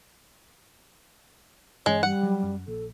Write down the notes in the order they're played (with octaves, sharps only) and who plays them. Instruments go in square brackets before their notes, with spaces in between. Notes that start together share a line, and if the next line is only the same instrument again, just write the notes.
[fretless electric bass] G2 E3 C#4 [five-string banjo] G#3 [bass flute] C#5
[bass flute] G3 [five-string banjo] F#5
[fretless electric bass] F#3
F#2
[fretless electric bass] A#1 [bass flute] A4